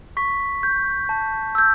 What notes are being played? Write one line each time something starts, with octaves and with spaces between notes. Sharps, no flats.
C#6 B6
G6
A5
E6 G6